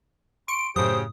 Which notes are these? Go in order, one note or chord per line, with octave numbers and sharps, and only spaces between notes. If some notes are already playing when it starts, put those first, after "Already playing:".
C6 C#6 C#7 D7
F#2 A2 C#3 F#3 G4 C5 D#6